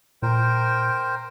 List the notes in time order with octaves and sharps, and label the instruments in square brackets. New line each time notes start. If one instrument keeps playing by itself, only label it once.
[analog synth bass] A#2 [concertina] A#4 C5 G5